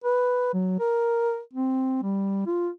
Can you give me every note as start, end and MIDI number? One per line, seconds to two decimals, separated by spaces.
0.04 0.49 71
0.54 0.76 54
0.79 1.40 70
1.53 1.98 60
2.03 2.43 55
2.46 2.69 65